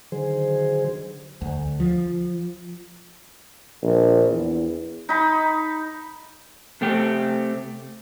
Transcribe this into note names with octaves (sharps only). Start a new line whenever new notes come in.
D3 D#3 F#3 G#4 C5
D2
F3
A#1
E2
D#4 B5
C3 A3 C4 G4